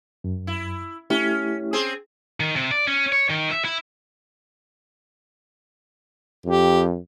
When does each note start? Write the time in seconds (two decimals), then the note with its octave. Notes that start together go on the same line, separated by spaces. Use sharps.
0.24 F#2
0.47 E4
1.10 A3 C#4 E4 G4
1.73 C4 G#4
2.40 D#3
2.56 C3
2.71 D5
2.87 C#4
3.12 C#5
3.30 D#3
3.51 E5
3.65 E4
6.46 F2 G4